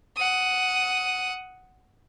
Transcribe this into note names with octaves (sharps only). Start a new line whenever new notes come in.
F#5 D#6